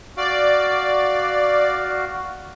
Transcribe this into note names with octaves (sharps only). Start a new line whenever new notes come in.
F#4 D5 F5